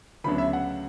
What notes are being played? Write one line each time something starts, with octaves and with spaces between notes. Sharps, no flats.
D2 C#3 F#3 B3 D4 B5
E5
F#5